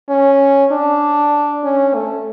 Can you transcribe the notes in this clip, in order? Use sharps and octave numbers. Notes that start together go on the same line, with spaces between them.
C#4
D4
C#4
A3